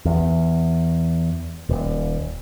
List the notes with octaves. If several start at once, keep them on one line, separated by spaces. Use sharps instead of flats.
E2
D#1